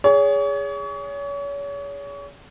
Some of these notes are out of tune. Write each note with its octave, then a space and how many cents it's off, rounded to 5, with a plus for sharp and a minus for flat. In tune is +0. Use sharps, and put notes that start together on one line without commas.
G#4 -15 C#5 +35